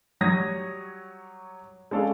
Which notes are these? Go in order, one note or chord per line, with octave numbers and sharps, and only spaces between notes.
F#3 G3 C#5 D#6 G#6 A#6
G#3 C#4 A4 D5 F5